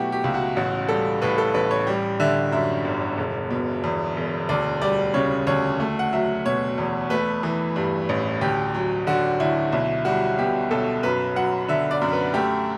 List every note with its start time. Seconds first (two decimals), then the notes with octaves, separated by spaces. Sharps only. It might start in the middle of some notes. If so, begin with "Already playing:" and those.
Already playing: B2 F#3 A3 E4 F#4 G4
0.12 G4
0.24 C#2
0.34 F#4
0.57 A1 F#4
0.89 G3 A4
1.22 A2 B4
1.38 A4
1.54 A1 B4
1.71 C#5
1.87 G3
2.20 D3 E5
2.52 F#2 E5
2.85 G1
3.17 E1
3.50 B2
3.84 E2
4.17 E1
4.49 D2 D5
4.81 G3 D5
5.14 C#3 C#5
5.47 D2 C#5
5.80 A3
5.99 F#5
6.13 F#3 E5
6.45 B2 C#5
6.78 E2
7.10 A3 B4
7.43 E3
7.76 G2
8.09 A1
8.41 D2 G4
8.74 F#3
9.07 D3 F#4
9.40 D2 E4
9.72 B1 E4
10.05 G3 F#4
10.38 B2 G4
10.71 B1 A4
11.03 F#2 B4
11.36 F#3 F#5
11.68 D3 E5
11.91 D5
12.01 F#2
12.13 B4
12.34 A3 G4